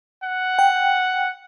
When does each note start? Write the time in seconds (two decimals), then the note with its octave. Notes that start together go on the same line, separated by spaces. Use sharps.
0.24 F#5
0.59 G5